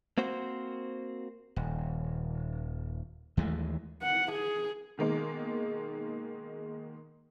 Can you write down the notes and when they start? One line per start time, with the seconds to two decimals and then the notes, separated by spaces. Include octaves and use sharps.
0.18 A#3 C4 F#4 C5
1.56 D#1
3.37 D#2 E3 G#3 A3
4.02 F#5
4.32 G#4
4.97 B2 D#3 G#3 A#3